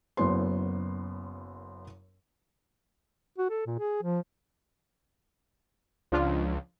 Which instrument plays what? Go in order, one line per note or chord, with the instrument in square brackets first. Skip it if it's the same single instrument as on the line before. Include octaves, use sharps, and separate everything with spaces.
[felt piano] F#1 F#2 B3 E4 C5 C6
[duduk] F#4
A4
A#2
G#4
F3
[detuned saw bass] C#2 [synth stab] F3 D4 F4